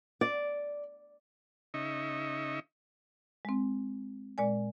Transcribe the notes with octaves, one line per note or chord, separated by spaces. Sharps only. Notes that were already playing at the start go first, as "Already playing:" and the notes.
D5
C#3 D#4 D#5 E5 C#6
G#3 C4
A#2 G#3 D5 G#5